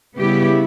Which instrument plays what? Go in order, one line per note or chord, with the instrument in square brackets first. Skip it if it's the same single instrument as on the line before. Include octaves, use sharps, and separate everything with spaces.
[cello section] C#3 G3 B3 E4 G4